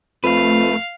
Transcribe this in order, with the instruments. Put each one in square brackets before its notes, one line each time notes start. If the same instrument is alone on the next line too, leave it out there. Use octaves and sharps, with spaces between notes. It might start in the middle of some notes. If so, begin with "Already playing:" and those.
[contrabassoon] F2 [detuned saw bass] A3 [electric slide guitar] B4 [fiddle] F5